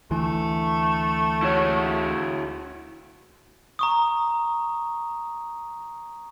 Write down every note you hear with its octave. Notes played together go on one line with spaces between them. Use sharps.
D2 E3 A3
E4 F#4 C#5
A#5 C#6 D#6